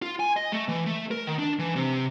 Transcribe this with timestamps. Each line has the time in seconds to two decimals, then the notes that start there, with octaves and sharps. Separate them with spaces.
0.02 F4
0.20 G#5
0.36 D#5
0.52 A3
0.69 E3
0.86 A3
1.11 A#4
1.27 D#3
1.39 D4
1.59 E3
1.76 C3